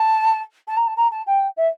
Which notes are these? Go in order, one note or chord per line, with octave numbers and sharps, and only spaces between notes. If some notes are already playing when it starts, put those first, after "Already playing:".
Already playing: A5
A5
A#5
A5
A#5
A5
G5
E5